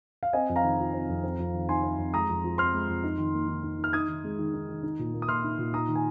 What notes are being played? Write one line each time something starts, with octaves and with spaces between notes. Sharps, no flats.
F5
C4 D#5 G#5
F2
F5 A#5
D#3
F4
C4
F2
C4
F2
D#3
D#4 G#5 C6
C4
F2
G#3 A#5 D#6
F2
F3
C4 C6 F6
G#3
F2
D#4
D#3
A#3
D#3
D#4
D#3
F6
D#4 D#6 G#6
D#3
G#3
D#3
D#4
D#3
D#4
A#2
A#3
D#6
A#2 C6 F6
D#4
A#2
D#4 A#5 D#6
D#3
G#5